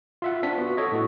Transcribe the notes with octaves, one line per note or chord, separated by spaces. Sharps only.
F4 E5 F#5
C4 D4 B6
B3 F#4
A4 C#5 D#5
A2 F#4